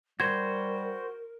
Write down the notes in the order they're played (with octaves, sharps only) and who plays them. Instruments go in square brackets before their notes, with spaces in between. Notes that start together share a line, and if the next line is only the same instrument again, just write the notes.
[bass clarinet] G3 [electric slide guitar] F#4 C5 [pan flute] A#4 [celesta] G#6